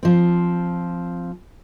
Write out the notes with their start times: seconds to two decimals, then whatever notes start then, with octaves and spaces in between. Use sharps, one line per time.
0.03 F3 C4